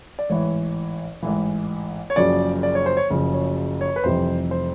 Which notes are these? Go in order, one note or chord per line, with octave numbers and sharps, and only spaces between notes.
D5
A1 G#2 E3 C#5
A1 G#2 E3
C#5
F#1 F#2 C#3 F3 D5
D5
C#5
C5
C#5
F#1 F#2 C#3 F3
C#5
C#5
B4
F1 F2 C3 E3 G3 C5
C5